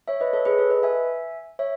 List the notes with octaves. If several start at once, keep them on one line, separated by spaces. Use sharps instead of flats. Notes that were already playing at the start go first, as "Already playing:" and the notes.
C#5 E5
B4 D#5
A4 C#5
G#4 B4
A4
B4 D#5
E5 G#5
C#5 E5